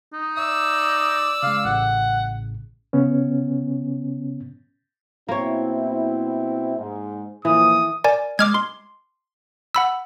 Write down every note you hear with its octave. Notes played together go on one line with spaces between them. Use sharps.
D#4
D5 E5 E6
C#3 G#3 F5
A1 A2 C#3 F#5
C#3 B3 C#4
B2 A#3 C4 E4 C#5
G#2
A#2 E3 F3 D#6
A#4 D5 G#5
G#3 D6 F6 G#6
C6
F#5 B5 E6